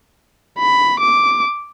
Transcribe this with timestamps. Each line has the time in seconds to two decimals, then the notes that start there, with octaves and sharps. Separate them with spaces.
0.59 B5
1.00 D6